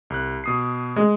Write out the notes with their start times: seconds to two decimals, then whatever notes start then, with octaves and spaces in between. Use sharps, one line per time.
0.10 C2 F#6
0.44 B2 D#6 C7
0.96 G#3